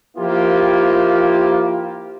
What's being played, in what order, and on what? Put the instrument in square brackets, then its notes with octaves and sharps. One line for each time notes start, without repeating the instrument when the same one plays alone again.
[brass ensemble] F3 A#3 E4 F4 G4